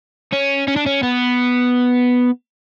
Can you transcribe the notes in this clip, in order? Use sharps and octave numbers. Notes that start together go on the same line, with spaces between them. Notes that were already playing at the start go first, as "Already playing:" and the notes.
C#4
C#4
D4
C#4
B3